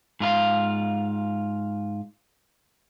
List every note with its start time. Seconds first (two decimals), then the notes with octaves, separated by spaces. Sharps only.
0.20 G#2 F4 A#4 F5